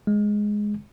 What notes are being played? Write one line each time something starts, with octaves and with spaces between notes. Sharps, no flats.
G#3